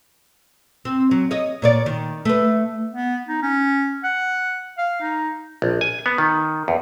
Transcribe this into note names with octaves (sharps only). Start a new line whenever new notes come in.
C4
F#3
C#5 D#5
A#2 C#5 D5
D#3
A3 B4
B3
D#4
C#4
F#5
F5
D#4
A#1
G#5
B3
D#3
E2